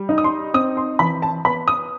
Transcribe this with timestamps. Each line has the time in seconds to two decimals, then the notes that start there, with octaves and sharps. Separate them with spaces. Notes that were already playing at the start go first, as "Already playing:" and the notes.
Already playing: G3
0.09 D#4
0.18 D#6
0.24 C6
0.54 C4 D#6
0.77 C6
0.99 E3 B5
1.22 A5
1.45 B3 B5
1.68 D#6